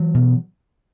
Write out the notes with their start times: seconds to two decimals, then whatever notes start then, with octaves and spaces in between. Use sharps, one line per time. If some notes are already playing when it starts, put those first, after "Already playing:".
Already playing: E3 F#3
0.15 B2